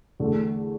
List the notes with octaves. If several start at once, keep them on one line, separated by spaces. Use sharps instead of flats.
E2 D3 A3